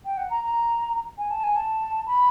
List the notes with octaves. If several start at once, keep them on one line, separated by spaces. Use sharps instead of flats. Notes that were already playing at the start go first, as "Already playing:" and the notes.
G5
F#5
A#5
A#5
G#5
A5
G#5
A5
B5